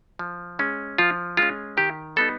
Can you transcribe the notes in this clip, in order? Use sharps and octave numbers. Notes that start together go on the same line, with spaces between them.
F3
G#3 C#4
F3 F4
G#3 C#4 F4
D#3 G4
G3 B3 D#4 A4